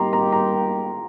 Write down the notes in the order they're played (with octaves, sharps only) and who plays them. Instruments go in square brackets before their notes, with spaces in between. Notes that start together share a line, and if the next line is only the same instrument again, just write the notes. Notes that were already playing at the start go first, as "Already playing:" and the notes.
Already playing: [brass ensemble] G3 A#3 D#4 G4 [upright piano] A#5 C6
[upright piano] A#5
A#5